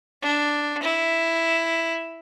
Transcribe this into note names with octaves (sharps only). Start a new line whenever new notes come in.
D4
E4